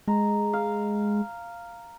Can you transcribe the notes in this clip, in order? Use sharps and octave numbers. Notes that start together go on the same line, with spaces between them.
G#3 A#5
F5